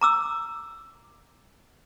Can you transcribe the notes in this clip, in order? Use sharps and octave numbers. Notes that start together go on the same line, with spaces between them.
A#5 D6 E6